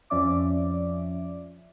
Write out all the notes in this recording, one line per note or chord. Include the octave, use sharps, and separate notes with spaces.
F2 F3 C#4 D5 E5 D6